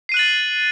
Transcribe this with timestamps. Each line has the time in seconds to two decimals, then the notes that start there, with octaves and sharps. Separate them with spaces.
0.09 C7
0.12 D#7
0.14 F#6
0.17 F#7
0.19 A6